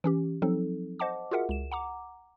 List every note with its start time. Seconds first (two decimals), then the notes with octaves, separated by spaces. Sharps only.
0.04 E3 C#4 G4
0.42 F3 F#3 C4 D#4 A4
0.99 C5 D#5 F#5 A5 D6
1.31 F4 F#4 G#4 A#4 E5 F#5
1.49 C#2 E7
1.71 F#5 A#5 D6